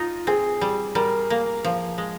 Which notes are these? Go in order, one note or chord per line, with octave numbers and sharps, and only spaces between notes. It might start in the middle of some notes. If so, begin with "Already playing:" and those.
Already playing: D#4 F4
C4 G#4
G3
G3 A#4
A#3
F3
G#3